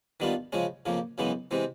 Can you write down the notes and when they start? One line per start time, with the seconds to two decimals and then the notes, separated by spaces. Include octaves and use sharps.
0.20 D#3 G3 B3 D4 F4
0.52 C#3 F3 G#3 C#4
0.86 F2 C#3 F3 A#3
1.18 F#2 C#3 E3 G#3 B3
1.51 C3 E3 G#3 C4